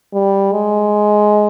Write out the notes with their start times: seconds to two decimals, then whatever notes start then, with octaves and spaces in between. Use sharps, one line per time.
0.14 G3
0.52 G#3